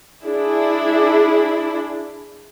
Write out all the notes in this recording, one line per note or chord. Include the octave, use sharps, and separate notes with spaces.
D4 E4 G#4